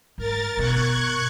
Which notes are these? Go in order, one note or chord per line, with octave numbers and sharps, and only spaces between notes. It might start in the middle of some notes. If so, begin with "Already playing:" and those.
G#2 A#4 A6
G1 B2 C#6 F#6 G#6